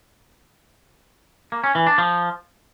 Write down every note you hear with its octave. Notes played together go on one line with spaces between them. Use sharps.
A#3
C#4
E3
D4
F3